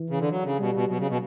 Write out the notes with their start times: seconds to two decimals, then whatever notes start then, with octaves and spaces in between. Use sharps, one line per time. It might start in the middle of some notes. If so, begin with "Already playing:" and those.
Already playing: E3
0.10 C#3
0.20 D3
0.30 F#3
0.44 C#3
0.59 B2 G3
0.75 B2
0.89 B2 F#3
0.98 C#3
1.09 B2